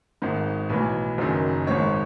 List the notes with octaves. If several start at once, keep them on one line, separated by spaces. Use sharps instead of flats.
G#1 G#2 D#3
B1 A2 E3 B4
F#1 F#2 D#3
G#1 G#2 D#3 C#5